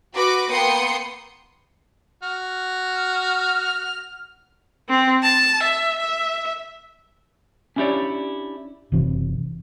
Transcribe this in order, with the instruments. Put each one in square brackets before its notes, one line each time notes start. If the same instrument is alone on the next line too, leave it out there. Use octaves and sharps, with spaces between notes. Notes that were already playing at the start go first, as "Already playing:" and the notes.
[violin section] F#4 B4 D6
A#3 B3 G5 C6 D#6 C#7
[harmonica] F#4 F6
[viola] C4
A5
E5
E5
[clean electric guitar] C#4 D4 E4 G4 C#5 D5
[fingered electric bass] F#1 C3 E3 C4